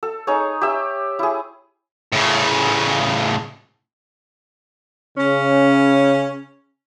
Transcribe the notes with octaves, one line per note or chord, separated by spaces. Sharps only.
A4
D#4 G#4 C#5
G4 E5 E6
E4 G#4
A2 C#3
C#3 C#4